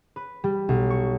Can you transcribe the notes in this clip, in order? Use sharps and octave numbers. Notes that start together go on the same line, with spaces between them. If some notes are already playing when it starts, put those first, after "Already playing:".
B4
G3
B1
C#6